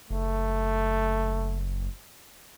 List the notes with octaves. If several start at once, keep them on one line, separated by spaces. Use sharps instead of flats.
F#1 A3